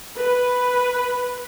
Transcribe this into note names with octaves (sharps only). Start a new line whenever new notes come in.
B4